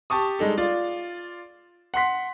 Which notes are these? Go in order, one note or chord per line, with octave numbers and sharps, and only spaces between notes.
G4 A5 C#6 D#6
G3 G#3 D#4 A4
F4 D5
F#5 C6 B6